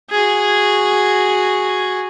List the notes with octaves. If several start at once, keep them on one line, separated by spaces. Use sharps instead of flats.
F#4 G#4